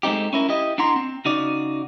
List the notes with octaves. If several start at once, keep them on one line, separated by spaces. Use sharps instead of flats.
G#3 A3 C4 D#4 G4
C#4 E4 A#4
E4 G4 D#5
D4 E4 F#5 A#5 C6
C4
C#3 D#4 F#4 D5